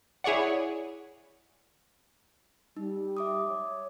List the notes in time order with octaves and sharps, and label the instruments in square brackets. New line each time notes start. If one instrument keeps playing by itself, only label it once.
[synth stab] E4 G#4 C#5 D5 F#5
[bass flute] G3 [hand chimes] D#4
[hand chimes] E5 D6 D#6
[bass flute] C#5